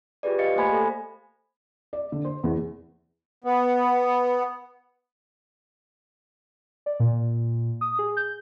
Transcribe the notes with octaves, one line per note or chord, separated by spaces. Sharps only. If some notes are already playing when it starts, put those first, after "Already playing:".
F4 G4 G#4 B4 D5
G4 D#5 F5 A6 C#7
A3 A#3 C5 G#5 B5 G#6
A4
D5
D3
C5
E2
B3
D5
A#2
D#6
G#4
G6